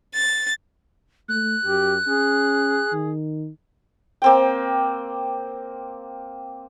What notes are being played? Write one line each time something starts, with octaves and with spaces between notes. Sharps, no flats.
A6
A3 F#6
F#2 G4
C#4 G#4
D#3
A#3 C4 G5